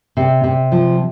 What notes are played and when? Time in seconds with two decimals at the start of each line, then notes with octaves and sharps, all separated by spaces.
0.17 C3
0.44 C3
0.72 F3